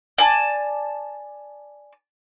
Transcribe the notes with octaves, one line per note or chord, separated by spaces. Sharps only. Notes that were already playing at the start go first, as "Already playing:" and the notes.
D5 G#5 A5